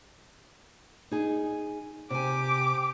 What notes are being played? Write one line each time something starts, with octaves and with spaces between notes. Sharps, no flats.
D#4 G#4
C3 G4 G#5 D6